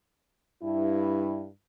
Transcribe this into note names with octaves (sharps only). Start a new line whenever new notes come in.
G2 E4